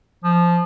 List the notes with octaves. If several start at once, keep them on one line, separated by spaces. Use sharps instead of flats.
F3